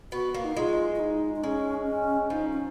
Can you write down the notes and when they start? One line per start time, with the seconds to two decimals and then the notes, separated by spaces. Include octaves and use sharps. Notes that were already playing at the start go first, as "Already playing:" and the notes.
0.12 B3 F#4
0.34 A#3
0.44 D#4
0.55 G#3 F4
0.95 F4
0.99 D#4
1.36 D#4
1.43 G#3 C#4
1.87 C#4
2.30 F3 D#4
2.53 C#4